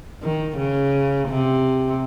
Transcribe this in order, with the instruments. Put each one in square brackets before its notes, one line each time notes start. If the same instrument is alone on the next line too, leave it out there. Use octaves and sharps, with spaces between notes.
[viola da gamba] D#3
C#3
C3